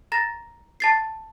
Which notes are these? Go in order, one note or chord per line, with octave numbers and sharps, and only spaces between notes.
A#5 A6 A#6
A5 A6 C7